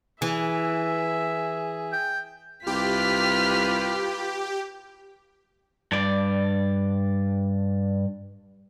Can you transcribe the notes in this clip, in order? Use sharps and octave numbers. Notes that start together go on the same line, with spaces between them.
E3 G#4 E5
G5
C2 F4 G4 B4 F6 B6
G2 D5